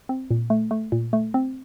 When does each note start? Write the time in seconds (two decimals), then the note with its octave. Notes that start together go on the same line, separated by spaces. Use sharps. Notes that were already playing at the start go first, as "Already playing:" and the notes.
0.09 C4
0.31 A#2
0.50 A3
0.71 A3
0.92 A#2
1.13 A3
1.34 C4